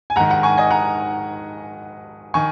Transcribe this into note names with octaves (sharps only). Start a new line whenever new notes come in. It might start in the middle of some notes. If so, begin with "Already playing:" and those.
G#5
G#2 D#3 F#5 A#5
F#5 A#5
G#5 C#6
D#5 G#5
F#5 A#5
D#3 G#5 C#6